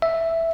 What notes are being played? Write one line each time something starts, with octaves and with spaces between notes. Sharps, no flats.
E5